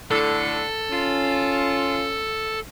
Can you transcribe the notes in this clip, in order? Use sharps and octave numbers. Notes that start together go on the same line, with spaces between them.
A2 D3 A4
C#4 F4